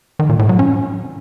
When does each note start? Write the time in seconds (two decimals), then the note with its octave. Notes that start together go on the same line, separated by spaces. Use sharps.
0.19 D#3
0.29 A#2
0.39 A2
0.49 F#3
0.59 C#4